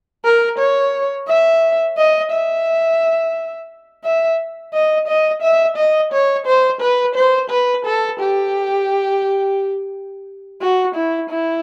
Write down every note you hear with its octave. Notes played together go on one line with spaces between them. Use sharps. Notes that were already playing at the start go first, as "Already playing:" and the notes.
A#4
C#5
E5
D#5
E5
E5
D#5
D#5
E5
D#5
C#5
C5
B4
C5
B4
A4
G4
F#4
E4
E4